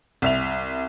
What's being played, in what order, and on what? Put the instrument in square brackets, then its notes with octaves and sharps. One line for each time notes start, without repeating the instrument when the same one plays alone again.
[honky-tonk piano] C2 E5 F7